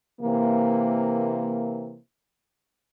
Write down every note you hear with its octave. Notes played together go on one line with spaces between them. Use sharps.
C3 E3 A#3